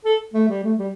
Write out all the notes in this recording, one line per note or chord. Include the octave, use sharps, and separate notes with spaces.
A4
A3
G3
A3
G3